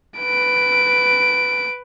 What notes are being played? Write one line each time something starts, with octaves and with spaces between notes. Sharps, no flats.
B4 D7